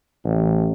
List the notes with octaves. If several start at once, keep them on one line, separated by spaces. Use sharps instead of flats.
A1